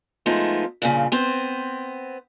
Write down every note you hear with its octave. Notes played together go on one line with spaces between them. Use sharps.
F3 G#3 A3 B3 D#4
G2 A#2 C#3
B3 C4 C5